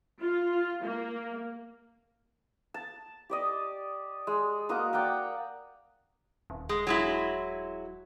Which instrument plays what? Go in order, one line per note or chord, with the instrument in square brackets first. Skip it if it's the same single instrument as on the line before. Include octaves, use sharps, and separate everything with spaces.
[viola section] F4
A#3
[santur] A5
G4 D5 D#5
G#3
A#3 F#4 D#5 A#5
D5 F#5 G5 A#5
[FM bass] D#1
[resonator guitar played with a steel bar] G#3
F#3 G#3 E4